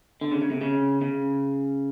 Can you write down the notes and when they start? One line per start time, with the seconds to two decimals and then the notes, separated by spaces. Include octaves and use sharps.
0.21 D3
0.31 C#3
0.42 C#3
0.51 C3
0.61 C#3
1.01 C#3